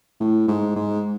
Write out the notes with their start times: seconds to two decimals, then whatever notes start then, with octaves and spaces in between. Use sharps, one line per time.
0.20 A2
0.48 G#2
0.76 G#2